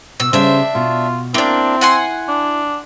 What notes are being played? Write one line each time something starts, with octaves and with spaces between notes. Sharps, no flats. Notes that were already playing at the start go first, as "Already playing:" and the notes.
B2 E6
C#3 G3 C#4 D4 C5 E5
B2 F4
A#3 C4 D4 E4
F#5 G#5 C6
D4